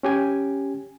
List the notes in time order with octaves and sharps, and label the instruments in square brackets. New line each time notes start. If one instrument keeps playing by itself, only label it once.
[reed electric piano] C#4 G4 G#5